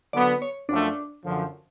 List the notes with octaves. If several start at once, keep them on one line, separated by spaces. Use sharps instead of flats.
D3 F#3 B3 D5
C#5
F#2 F3 A3 D4
F#2 D3 F3